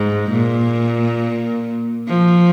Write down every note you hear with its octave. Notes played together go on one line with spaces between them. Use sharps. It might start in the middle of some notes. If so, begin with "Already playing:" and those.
Already playing: G#2
A#2
F3